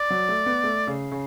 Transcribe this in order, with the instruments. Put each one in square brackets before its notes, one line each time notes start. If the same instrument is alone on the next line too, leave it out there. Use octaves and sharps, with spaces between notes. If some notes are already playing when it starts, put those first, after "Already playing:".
Already playing: [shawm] D5
[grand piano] F#3
A3
B3
A3
C#3
C#3